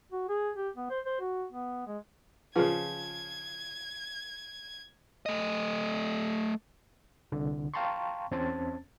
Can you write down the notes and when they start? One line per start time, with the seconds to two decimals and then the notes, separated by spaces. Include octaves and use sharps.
0.12 F#4
0.29 G#4
0.56 G4
0.76 B3
0.90 C5
1.06 C5
1.20 F#4
1.52 B3
1.87 G#3
2.56 C#3 F3 F4 G#4 B4 G#6
5.26 A3 D#5
7.32 C2 D3
7.74 F5 G5 A5 A#5 C6 C#6
8.31 E2 C4 C#4 C5 A5 A6